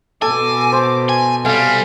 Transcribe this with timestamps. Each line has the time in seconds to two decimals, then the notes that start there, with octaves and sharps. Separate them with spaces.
0.22 B2 A4 G#5 D6
0.73 C5
1.09 G#5
1.45 C2 G3 A4 F5 G#5